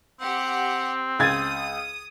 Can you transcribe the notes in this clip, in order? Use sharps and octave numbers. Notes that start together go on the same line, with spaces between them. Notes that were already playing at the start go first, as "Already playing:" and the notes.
C4 G4 F#5
C#2 D#6 G#6 A6